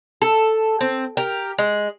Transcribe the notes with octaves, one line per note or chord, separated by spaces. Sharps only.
A4
C4
G4 A#4
G#3